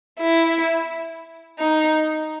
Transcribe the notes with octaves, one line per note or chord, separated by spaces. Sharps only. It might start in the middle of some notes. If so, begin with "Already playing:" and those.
E4
D#4